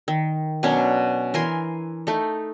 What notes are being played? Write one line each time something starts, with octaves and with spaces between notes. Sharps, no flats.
D#3
B2 F#3 C#4 D4
E3 A#4 G#5 C6
A3 D#4